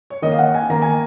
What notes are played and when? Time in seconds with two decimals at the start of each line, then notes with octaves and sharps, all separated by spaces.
0.10 C#5
0.22 D#3 A#3 D#5
0.32 F5
0.39 F#5
0.54 G#5
0.69 D#3 A#3 A#5
0.82 G#5